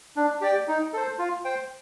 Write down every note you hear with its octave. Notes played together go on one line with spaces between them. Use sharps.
D4
G4 D5 G5
D#4
A4 C5
F4
C5 G5